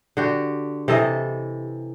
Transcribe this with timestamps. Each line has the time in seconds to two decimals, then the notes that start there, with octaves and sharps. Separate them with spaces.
0.17 D3 F#4 G4
0.88 C3 E3 A4 D#5